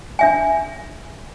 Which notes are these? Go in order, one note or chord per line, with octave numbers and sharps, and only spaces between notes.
D4 E5 G#5